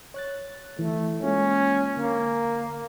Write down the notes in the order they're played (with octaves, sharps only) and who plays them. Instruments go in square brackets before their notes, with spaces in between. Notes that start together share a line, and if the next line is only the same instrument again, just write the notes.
[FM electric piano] C#5 F#6 A6
[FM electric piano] E3 [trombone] A3
[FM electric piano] G#3 A#3 F4 [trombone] C#4
[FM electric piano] D3 [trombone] A#3